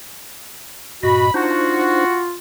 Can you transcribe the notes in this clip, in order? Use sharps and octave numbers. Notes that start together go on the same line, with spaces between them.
G2 A#2 F#4 D#5 B5
D4 D#4 F4 F#4 C5